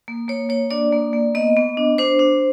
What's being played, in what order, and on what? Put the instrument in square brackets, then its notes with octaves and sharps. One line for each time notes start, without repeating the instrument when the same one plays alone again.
[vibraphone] A#3
A#3 C#5
A#3 C#5
D4 D5
A#3
A#3
B3 D#5
B3
D4
D4 C5
D4